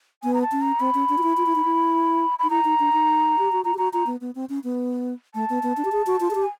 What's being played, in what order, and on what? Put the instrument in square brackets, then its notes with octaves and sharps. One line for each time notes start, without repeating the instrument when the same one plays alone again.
[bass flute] B3 [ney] G#5
[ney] A#5
A5
[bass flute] C#4
[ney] A#5
[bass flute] C4 [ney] B5
[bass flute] C#4
D4
F4
E4
F4
E4
D#4
E4
[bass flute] D#4 [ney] B5
[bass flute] E4 [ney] A#5
[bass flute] D#4
D4
D#4
G4
F#4
[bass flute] F4 [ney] A#5
[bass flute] G4
[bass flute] F#4 [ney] A#5
[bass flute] F4 [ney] A#5
[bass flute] B3
B3
C4
C#4
B3
[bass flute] A3 [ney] A5
[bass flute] B3
B3
D4
G4
G#4
F#4
F4
G#4
G4
[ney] G#5